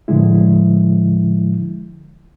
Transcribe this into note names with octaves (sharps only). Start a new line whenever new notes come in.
A2 D3 F3 G#3 E4